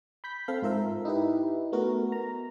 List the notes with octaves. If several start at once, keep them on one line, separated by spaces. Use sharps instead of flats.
B5 G6 B6
C4 A4 F5
G#2 F4 A#4 E5
D#4 E4 G4 B4
A3 B3 F#4 A#4
A#5